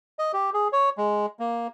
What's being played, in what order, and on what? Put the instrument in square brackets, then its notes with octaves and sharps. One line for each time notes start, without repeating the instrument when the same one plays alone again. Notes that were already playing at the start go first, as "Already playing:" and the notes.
[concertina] D#5
G4
G#4
C#5
G#3
A#3